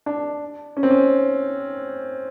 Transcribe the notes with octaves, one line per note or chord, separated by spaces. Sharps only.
D4
C#4
C4
C#4